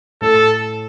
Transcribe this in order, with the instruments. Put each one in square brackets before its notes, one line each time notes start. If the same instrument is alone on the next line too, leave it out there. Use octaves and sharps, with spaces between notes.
[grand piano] A2 A3 [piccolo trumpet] A4